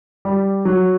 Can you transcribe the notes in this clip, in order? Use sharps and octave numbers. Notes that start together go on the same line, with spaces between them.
G3
F#3